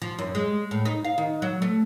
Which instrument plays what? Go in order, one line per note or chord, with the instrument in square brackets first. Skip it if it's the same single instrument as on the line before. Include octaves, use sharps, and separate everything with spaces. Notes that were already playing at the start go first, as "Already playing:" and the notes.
[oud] F3
F#2
G#3
A2
D#4
F5
D#3
F#3
A3